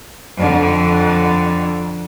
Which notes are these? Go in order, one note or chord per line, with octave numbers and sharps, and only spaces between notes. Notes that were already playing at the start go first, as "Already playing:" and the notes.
F2 D3